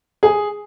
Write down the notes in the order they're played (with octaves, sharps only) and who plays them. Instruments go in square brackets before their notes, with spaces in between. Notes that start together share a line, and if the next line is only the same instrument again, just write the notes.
[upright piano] G#4